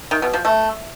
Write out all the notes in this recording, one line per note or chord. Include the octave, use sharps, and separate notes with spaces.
D#3
B2
F3
A3